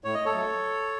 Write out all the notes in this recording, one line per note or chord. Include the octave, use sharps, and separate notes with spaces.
A2 C#5
D#5
A4 C#5
F#3 A3